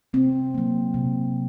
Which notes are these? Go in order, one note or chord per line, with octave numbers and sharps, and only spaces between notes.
C3 C4
F#3 A#3
C3